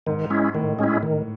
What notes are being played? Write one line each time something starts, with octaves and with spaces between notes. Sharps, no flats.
G#2 D#3
G#3 C#4 E4
A2 D#3
G#3 C#4 E4
D#3